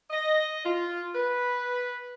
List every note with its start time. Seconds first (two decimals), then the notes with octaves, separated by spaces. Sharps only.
0.10 D#5
0.64 F4
1.15 B4